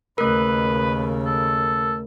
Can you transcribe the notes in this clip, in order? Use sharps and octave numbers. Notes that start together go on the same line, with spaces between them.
D#2 C#3 A3 A#4 B4
A4